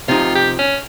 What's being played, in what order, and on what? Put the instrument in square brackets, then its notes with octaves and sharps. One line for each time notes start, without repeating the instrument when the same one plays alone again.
[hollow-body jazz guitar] C3 F3 D#4 [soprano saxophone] F4
[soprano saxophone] G4
C#4